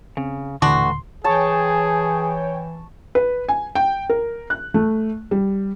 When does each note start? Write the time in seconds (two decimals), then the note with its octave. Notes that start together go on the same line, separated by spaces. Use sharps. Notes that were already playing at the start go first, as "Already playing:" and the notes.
0.17 C#3 C4
0.62 D#1 A2 D3 E3 D4 F#4 C6
1.24 E3 G#4 C#5 G5 A5 C#6
3.15 B4
3.48 G#5
3.75 G5
4.10 A#4
4.50 F#6
4.74 A3
5.31 G3